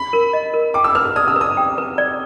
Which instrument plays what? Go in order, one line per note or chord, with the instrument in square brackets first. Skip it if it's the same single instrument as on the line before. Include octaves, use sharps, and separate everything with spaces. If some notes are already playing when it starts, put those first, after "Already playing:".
Already playing: [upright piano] B5
[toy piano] A#4
D#5
A#4
[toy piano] G5 [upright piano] D6
[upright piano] E6
[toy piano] B4 [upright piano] F6
[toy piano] D5 [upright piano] D#6
[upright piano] E6
[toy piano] B4
[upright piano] D#6
[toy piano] G5
B4
D5